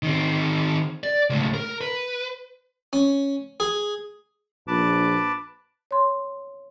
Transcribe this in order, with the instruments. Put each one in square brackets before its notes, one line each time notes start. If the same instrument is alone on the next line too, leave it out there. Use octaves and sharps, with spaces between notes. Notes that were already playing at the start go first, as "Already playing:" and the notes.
[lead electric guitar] D#3 C4
D5
C#2 A2
A#4
B4
[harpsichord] C#4
G#4
[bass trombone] A#1 [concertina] B4 A5 D6
[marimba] C#5 C6